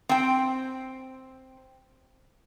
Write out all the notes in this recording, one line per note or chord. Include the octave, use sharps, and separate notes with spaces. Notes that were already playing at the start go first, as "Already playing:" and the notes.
C4 G5